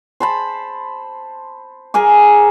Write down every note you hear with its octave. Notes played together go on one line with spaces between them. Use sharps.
C5 A5 B5
G#4 A#4 G#5 D6